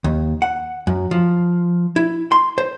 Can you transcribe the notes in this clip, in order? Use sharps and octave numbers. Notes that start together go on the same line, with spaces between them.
D#2
F#5
F#2
F3
E4
C6
C5